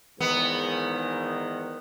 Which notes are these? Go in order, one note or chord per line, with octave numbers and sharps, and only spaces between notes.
E2 G#2 D#3 B3